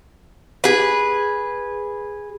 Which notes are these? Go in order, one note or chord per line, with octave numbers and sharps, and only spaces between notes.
G#4 B4